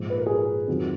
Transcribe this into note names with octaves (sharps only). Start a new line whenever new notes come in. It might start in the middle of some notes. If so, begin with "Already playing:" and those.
Already playing: A#1 G#2 F3 G#3
B4
A#4
G#4
A#4
F2 D#3 F#3